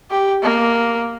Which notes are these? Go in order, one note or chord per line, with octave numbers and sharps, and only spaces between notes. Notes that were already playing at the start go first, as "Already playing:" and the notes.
G4
A#3